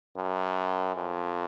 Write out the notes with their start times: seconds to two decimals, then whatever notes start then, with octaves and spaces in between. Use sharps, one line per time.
0.17 F#2
0.96 F2